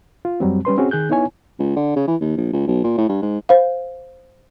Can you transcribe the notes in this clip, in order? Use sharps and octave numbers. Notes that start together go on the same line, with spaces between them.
F4
F#2 F#3 G3 C4
G3 C#4 B4 C6
C4 C#4 F#4 G#4
D#3 G#4 F#6 G6
B3 D#4 E4 C#5 G#5
C#2
D3
C#3
E3
D#2
A#1
C#2
B1
A#2
A2
G2
G#2
C5 F5